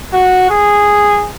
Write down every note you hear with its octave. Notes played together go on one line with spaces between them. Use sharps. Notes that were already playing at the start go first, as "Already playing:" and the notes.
F#4
G#4